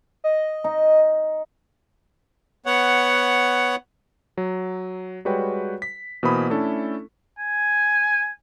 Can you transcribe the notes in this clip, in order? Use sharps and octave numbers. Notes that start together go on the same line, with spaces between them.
D#5
D#4
B3 C#5 F#5
F#3
G3 G#3 F#4 B4 C#5 G5
B6
B2 E3 A#3 C5 B5 D#6
A3 C#4 D4 E4 A4
G#5